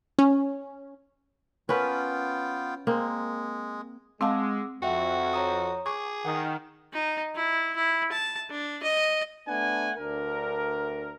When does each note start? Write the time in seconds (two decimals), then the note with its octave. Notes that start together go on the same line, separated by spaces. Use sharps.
0.18 C#4
1.69 B3 C#4 F4 A#4 B4 G5
2.87 G#3 A#3 C4
4.21 G#3 C4 F5 F#5 A5 D6 E6
4.82 F2 F#4 E5 F#5 G5
5.33 C#5 A#5 D#6
5.86 G#4 C#6 D6
6.25 D#3 F#5 G5 D#6
6.93 D#4
7.35 E4
7.76 E4
8.12 A5
8.50 D4
8.83 D#5
9.48 A3 B3 D4 F#5 G#5
9.97 D2 D4 A#4